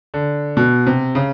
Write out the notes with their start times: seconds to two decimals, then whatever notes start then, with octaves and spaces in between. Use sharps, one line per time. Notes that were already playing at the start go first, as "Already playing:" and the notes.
0.14 D3
0.57 B2
0.87 C3
1.15 C#3